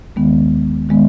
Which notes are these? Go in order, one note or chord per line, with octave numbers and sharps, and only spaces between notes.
D#2 D#3 G#3 B3
D#3 G#3 B3